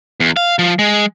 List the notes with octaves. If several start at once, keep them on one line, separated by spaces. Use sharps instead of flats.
E2
F5
F3
G#3